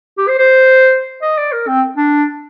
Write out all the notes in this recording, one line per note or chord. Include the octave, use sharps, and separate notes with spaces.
G4
C5
C5
D#5
D5
A#4
C4
D4